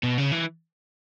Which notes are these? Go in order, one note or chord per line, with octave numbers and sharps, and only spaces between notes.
B2
C#3
E3